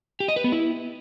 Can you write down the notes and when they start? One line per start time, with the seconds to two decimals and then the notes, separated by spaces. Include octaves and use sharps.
0.20 G4
0.28 D#5
0.36 B4
0.44 B3
0.52 E4